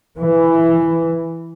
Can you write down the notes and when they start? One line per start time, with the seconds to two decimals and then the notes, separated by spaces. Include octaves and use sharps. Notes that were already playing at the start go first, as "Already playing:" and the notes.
0.18 E3